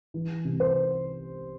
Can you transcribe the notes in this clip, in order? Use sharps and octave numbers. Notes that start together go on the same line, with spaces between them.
E3
C3
C5